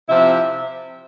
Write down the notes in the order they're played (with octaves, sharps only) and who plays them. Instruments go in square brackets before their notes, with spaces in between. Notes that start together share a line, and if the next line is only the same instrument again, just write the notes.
[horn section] C3 F3 C4 E4 E5